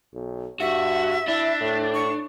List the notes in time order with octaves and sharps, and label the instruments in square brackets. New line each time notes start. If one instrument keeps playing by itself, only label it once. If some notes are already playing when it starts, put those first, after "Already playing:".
[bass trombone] B1
[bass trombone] G2 [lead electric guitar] F#4 [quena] E5
[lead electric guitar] D4 [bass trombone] E4
[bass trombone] A2
[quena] C#6